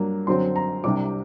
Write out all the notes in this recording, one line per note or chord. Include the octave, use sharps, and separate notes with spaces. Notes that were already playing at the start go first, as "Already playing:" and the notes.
Already playing: G2 F#3 A#3 D4
F#2 D3 F#3 C4 C6
A#5
C2 C3 G3 D4 D6